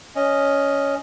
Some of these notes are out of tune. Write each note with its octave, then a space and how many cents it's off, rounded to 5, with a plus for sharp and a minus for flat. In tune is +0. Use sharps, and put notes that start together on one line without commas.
C#4 +10 D#5 +0